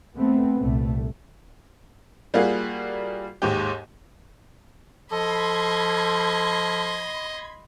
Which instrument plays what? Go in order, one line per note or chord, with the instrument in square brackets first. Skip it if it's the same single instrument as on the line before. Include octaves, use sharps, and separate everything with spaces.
[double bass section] A3 B3 C4
C2 A#2 A3
[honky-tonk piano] G3 A#3 F4 F#4 G#4
D#2 G#2 G4
[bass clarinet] F3 [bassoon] A4 [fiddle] D#5 [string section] B5 C6 G#6